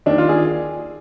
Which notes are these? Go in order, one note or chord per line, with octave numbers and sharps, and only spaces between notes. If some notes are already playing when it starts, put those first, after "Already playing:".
D#2 D#3 D4
F4
G#4